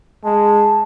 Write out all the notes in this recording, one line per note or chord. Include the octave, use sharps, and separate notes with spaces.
G#3 A5